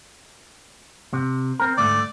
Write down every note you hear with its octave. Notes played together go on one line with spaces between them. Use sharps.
C3
C4 A#4
D2 G#2 A3 D5